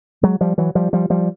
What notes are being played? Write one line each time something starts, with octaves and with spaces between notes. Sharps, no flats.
F#3 G#3
F3 G3
E3 F#3
F3 G3
F3 G3
F3 G3